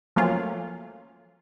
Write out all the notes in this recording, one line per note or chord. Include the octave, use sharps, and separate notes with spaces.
F3 F#3 A3 A#3 C#4 F4